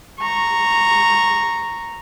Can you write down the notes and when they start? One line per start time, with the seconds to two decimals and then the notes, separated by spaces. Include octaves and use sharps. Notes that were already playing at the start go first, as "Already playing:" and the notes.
0.20 A#5 C#6